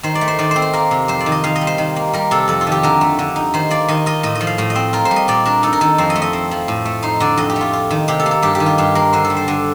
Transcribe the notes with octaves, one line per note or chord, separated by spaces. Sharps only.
D#3 C5
D5
A3
C5
D#3 D5
C4 C5
C5
A#3 A#4
C3
F2 C5
D5
D#3
D#5
D#3 F5
D#5
G3
C5
D#3
A#3
G3 A#4
C3 A4
F2 A4
F4
D#3
G4
D3 A#4
A3
D3
D#4
D#3 C5
A#3 D5
D#3 D#5
F4 D#5
A2 D#5
D#5
F3
F5
A2 F5
D#5
C4
F4 A#4
C5
G3
D#5
A#2 D5
D4 A#4
D#4 A4
A#4
D#3 A4
F2 C5
D#5
A3
D#5
C4
F3
A2
A3
D#4 C5
D3 D5
F2 D#5
G4
A3 F4
F4
D#3
C3 G4
A4
A#3
A4
G2 G4
G4
D#3
F4
G2 G4
A#3 A#4
D3 C5
A4
G3
C5
D3